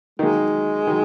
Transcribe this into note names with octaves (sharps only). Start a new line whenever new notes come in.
D#3 F#3 G#3 A#3
D#3 F#3